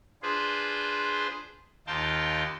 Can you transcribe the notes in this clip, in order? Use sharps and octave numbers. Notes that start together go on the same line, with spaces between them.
D4 F4 G#4 B4 C5
D#2 D#4 F4 G5 A5